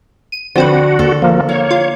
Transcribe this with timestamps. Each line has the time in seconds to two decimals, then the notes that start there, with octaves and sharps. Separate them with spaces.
0.32 D#7
0.56 D3 F3 C4 F#4 B4
0.99 D#2 A4
1.22 F3 A#3
1.49 A#3 C#5
1.71 F4